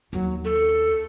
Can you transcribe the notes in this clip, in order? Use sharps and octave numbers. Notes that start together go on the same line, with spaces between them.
D#2 F#3
A4